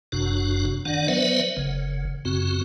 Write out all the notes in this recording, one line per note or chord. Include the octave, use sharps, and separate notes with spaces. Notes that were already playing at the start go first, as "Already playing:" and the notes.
F#1 F#2 C3 D4 F#4
D#3 D4 D5 F#5
F#3 B3 B4 C5 D5 E5
F#1 C#3
F#2 C#3 C4 F#4